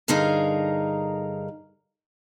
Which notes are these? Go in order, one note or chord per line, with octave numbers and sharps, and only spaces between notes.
G2 D3 D#4 G#4 A#4 F5